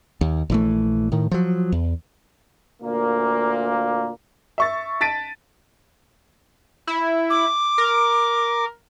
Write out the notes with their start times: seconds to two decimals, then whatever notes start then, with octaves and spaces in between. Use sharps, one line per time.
0.21 D#2
0.50 A#1 E3 A3
1.12 A2 D#3
1.31 F3 F#3
1.72 E2
2.82 D2 A#2 A#3
4.58 E5 C#6 A6
5.01 A5 A6 B6 D7 D#7
6.87 E4
7.30 D6
7.78 A#4